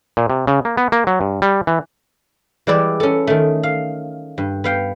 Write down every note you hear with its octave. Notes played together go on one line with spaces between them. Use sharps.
A#2
C3
C#3
A#3
B3
A#3
F#3
G2
G3
E3
E3 G3 G#3 E4 D5
C#4 A4
D#3 A3
F5
G2
B3 F5 G5